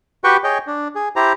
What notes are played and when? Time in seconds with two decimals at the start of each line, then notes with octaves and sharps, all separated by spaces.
0.24 F#4 G4 B4 G5 C#6
0.44 G#4 C#5 D#5 G5
0.67 D4
0.95 G#4
1.16 E4 G4 C5 A#5